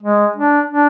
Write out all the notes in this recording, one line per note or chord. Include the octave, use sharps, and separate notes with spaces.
G#3
D4
D4